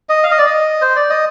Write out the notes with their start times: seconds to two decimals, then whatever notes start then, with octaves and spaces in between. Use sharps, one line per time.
0.09 D#5
0.23 F5
0.31 D#5
0.38 D5
0.46 D#5
0.82 C5
0.96 D5
1.10 D#5